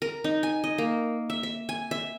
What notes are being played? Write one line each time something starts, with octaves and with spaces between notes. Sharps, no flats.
A#4
D#4
G#5
D#5
A#3
E5
E5
G#5
E5